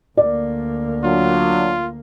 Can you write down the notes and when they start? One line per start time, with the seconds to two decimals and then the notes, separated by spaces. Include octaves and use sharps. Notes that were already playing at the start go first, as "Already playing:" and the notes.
0.17 D2 A#3 D5
1.04 F#3 D4 F4